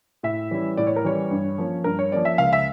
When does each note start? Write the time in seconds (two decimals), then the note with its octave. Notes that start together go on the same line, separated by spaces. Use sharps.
0.23 A2 E5
0.51 E3 G3 C#4 E4
0.77 A2 D5
0.87 C#5
0.96 A#4
1.04 E3 G3 C#4 E4 C#5
1.31 G2
1.58 F3 A#3 C#4
1.84 G2 A#4
1.99 C#5
2.12 F3 A#3 C#4 D5
2.25 E5
2.38 C#2 F5
2.53 E5